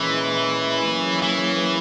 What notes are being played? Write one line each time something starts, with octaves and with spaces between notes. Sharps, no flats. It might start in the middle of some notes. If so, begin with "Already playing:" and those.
Already playing: A#2 E3 G#3 C#4 E4
F#3 A#3 C#4 G#4 C#5
E3